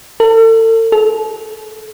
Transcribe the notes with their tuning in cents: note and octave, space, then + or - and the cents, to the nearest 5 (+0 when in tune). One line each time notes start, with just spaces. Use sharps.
A4 +40
A4 -35